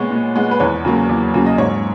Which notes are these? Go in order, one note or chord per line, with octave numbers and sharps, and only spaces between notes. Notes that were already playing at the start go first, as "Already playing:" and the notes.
Already playing: A#2 G#3 B3 C#5
A#2
G#3 B3
B4
E2 C#5
C#3 F#3 A#3
E2
C#3 F#3 A#3
D#5
G#2 C#5